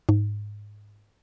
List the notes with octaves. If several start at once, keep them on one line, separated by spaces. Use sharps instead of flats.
G#2